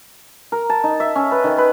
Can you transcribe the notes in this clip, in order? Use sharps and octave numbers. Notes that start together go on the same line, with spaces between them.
A#4
A5
D#4
E5
C#4
B4
D#3
B4